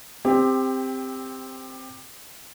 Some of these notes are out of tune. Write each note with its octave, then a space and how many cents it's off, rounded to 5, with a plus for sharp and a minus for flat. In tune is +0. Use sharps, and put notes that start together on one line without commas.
C4 +0 G4 +20